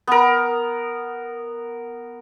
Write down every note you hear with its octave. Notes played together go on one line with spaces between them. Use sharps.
B3 A#4